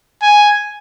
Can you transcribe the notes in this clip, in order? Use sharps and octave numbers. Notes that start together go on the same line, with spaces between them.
G#5